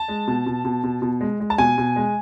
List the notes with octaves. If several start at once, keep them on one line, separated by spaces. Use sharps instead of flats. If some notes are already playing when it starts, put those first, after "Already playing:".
Already playing: A5
G#3
B2
B2
B2
B2
B2
G#3
G#3
A5
B2 G#5
B2
G#3